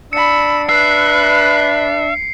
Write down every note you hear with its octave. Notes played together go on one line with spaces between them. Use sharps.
D4 B5 E6 C#7
B4 E5 F#6 C7